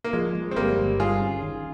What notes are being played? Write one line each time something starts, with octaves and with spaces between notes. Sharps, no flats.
A#3
F3 G#3
G#3
C4
G1 G3 A#3
G1
G3 F4 G#4
C#4
D#3